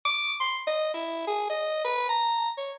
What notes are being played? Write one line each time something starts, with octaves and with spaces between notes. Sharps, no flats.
D6
C6
D#5
E4
G#4
D#5
B4
A#5
C#5